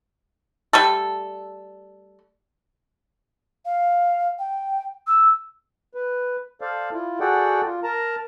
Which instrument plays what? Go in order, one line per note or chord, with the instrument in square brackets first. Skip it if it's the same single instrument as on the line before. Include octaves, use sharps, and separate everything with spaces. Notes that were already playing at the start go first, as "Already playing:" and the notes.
[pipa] G3 A3 A4
[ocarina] F5
G5
E6
[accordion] B4
A4 C5 D5 F5
E4 F4
F#4 G#4 A4 D5 F#5 G5
F4
A#4 A5 A#5